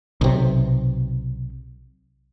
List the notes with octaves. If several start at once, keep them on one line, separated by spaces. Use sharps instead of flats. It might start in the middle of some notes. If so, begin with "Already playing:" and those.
B1 C3